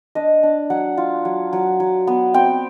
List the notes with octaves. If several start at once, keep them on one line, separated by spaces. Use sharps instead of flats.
D4 D#5
D4
F#3 F#5
F4
F#3
F#3
F#3
B3
C4 G5